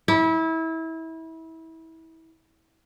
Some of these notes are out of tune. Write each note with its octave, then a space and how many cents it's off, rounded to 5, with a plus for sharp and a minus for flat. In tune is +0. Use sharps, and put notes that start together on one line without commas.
E4 -25